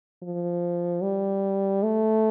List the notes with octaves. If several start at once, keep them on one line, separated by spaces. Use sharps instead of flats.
F3
G3
A3